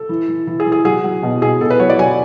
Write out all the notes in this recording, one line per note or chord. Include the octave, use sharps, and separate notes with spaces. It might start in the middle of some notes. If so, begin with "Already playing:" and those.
Already playing: A4
E3
E3
E3
G#4
E3
G#4
F#3 G#4
F#3
B2
B2 G#4
B2 A4
B4
F#3 C#5
D5
F#3 G#5